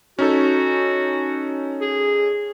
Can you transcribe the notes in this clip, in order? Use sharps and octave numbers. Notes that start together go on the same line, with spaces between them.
C#4 D#4 F#4 A4
G#4